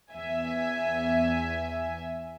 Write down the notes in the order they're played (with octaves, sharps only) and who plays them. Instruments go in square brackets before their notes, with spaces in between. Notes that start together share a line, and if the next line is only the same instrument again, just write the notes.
[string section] E2 E5 G#5